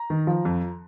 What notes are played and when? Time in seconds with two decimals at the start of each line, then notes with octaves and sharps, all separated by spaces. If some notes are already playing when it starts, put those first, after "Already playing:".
Already playing: A#5
0.10 D#3
0.27 F3
0.45 F2